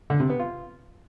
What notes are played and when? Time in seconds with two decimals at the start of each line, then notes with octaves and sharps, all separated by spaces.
0.10 D3
0.20 C3
0.30 B3
0.39 F4